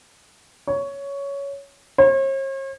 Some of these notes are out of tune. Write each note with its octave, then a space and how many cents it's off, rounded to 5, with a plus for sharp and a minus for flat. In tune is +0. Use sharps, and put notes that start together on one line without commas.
C#5 +10
C#5 -45